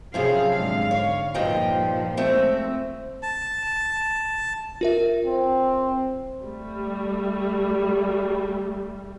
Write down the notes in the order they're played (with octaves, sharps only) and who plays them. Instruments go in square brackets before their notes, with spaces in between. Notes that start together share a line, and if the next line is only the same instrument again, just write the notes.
[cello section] F#2 G#4 F5 [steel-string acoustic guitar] A2 C3 F3
[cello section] G#2 D3 F5
[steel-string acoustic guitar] C#5
[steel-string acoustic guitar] G2 D#4 G5 [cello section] A#2 F3
[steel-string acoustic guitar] G#3 A3 C4
[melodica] A5
[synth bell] F4 A#4 E5
[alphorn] C4
[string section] G3 A3